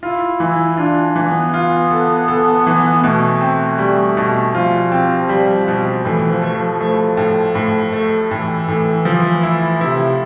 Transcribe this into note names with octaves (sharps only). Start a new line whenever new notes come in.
E4 F4
E3 E4
D4 F4
D4
E3
B3
F4
A4
A4
E3
B2 A3
C4
G3
B2
F3 F4
C4
G3
B2
A2 E3
F3
A3
F3
F3 A3
A2
A2
A3
A2 E3
A2
F3
E4
C3 E4